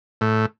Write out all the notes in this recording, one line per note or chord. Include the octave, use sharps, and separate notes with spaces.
A2